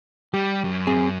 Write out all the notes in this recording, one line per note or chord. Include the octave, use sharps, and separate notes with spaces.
G3 G4
F#2
C4 G#4